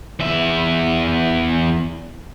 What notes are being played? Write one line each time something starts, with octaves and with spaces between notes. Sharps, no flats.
E2 E5